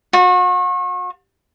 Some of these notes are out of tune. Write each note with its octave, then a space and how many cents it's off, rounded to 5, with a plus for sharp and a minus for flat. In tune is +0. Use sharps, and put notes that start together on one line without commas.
F#4 -40